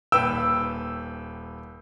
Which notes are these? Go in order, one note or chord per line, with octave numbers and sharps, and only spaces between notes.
D#1 B4 G5 E6